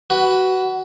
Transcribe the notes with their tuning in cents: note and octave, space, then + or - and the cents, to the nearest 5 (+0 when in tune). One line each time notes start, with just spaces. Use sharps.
F#4 +20 B4 +0